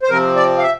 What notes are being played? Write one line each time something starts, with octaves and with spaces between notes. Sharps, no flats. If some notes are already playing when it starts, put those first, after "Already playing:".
C5
C3 F3 C4 A#4
D5
F5
E5